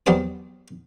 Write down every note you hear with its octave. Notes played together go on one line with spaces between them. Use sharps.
E2 F#3 G3 G4 C5 D#6